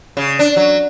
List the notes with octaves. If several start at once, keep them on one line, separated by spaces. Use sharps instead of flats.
C#3
D4
F#3